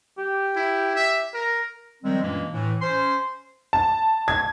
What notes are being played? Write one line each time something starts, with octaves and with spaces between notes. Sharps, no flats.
G4
E4
E5
A#4
D#3 F3 G3 G#3 C4
F#2 A#2 E3 G#3 A#3 D4
A2 E3
C#4 C5 C6
A5
G#6